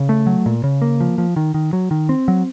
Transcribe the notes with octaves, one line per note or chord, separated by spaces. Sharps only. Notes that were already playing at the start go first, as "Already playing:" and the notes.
Already playing: C#3
A3
F#3
A#2
C#3
A#3
F3
F3
D#3
D#3
F#3
D#3
C4
F#3